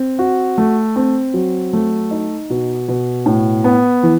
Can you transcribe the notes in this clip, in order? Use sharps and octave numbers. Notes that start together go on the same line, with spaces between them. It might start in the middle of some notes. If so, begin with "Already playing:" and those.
Already playing: C4
F#4
A3
C4
F#3
A3
D#4
B2
B2
A2
B3
E3